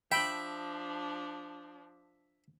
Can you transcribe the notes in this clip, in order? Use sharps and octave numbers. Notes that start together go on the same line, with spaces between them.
F3 D4 E5 G5 B5